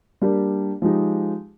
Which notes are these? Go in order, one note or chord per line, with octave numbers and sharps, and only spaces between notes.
G3 A#3 D4 G4
F3 G#3 D#4 G4